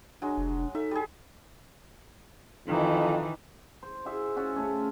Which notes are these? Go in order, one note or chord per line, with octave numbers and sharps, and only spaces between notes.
F#3 G#3 D4
F1
D#4 A4 E5
G3 G#4
F2 D#3 E3
C5
F4 F#4 G#4 E5
C#4 F4 F#4 E5
C#3 A3 C#4